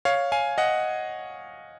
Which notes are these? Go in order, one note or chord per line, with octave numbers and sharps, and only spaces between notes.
C#5 F5
F5 G#5
D#5 F#5